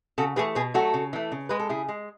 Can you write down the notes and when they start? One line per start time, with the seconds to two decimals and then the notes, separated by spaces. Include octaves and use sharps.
0.18 C#3 F#4 A4
0.36 E3 A3 G#4 B4
0.55 B2 G#4 B4
0.74 F#3 A3 F#4 A4
0.94 C#3
1.13 E3 A3
1.32 C#3
1.49 G#3 B4
1.59 A4
1.69 C#3 E4 G#4
1.89 G#3